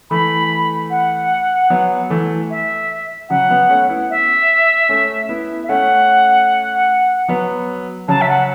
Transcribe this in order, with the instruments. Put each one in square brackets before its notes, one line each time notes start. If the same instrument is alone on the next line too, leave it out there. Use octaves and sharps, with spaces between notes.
[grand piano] E3 A3 [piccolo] B5
[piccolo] F#5
[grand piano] F#3 B3
E3 A3
[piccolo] E5
[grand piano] C#3 F#3 [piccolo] F#5
[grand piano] F#3 B3
A3 C#4
B3 E4
[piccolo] E5
[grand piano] A3 C#4
B3 E4
[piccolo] E5
[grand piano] A3 C#4 [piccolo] F#5
[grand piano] F#3 B3
[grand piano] C#3 F#3 [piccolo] A5
[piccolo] E5
F#5